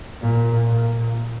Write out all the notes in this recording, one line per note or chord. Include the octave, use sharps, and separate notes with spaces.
A#2
A#2